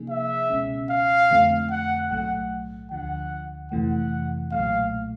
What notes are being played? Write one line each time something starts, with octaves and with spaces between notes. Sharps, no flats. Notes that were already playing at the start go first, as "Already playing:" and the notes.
Already playing: C3 F3 A#3 D#4 G#4
E5
C#2 B2 G#3 C#4
F5
F2 D3 F3 A3 C4
F#5
B1 A2 F#3 A3 F#5
D2 D3 F3 F#5
F2 C3 E3 A3 F#5
B1 A#2 F#3 A3 F5